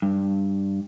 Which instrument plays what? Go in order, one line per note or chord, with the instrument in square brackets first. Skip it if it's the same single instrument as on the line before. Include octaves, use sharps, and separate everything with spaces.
[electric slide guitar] G2